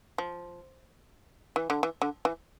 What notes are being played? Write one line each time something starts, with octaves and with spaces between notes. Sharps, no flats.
F3
E3
D3
E3
D3
E3